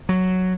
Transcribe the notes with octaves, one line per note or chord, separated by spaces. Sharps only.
F#3